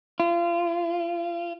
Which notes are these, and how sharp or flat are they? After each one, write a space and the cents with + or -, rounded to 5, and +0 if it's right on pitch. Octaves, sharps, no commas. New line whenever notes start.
F4 -30